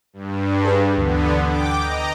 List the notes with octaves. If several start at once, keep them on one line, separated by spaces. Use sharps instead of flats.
G2
G#4 B4
D2 D3 E3 B3
G5 D6
D#5 A#5